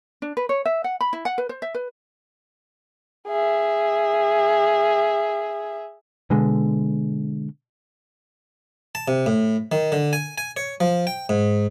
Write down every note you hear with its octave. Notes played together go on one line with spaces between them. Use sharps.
D4
B4
C#5
E5
F#5
B5
E4
F#5
B4
C5
E5
B4
G#4 E5
B2 D3 G#3
A5
C3
A2
D#3
D3
G#5
G#5
C#5
F3
G5
G#2